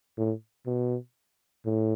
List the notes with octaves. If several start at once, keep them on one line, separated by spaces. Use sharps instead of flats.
A2
B2
A2